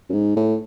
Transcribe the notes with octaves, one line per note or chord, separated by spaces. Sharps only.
F#2
G#2
A2